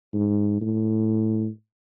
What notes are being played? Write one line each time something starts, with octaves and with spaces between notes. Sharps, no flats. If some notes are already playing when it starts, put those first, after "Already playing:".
G#2
A2